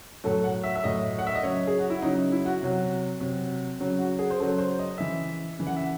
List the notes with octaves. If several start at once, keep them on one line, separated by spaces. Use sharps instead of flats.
A2 F#3 A4
F#5
E5
E5
A2 F#3 D#5
F#5
E5
D#5
C#3 F#3 C#5
G#4
F#4
E4
C#3 F#3 D#4
C#4
E4
F#4
C3 F#3
C3 F#3
C#3 F#3
F#4
G#4
C5
C#3 F#3 A4
C5
D#5
C#3 E3 E5
C#3 E3
F#5
E5